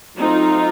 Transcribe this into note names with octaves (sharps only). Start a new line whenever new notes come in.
F#3 A3 C4 D#4 F4